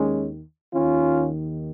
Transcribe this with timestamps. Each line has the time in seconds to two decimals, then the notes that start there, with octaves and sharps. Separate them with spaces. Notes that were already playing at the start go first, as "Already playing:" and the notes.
Already playing: D#2 D#3 G#3 C#4
0.73 D#2 D#3 C#4 F4